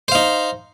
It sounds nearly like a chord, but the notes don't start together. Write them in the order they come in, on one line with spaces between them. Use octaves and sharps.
C5 F5 D#4